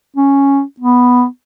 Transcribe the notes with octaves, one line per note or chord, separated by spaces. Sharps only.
C#4
B3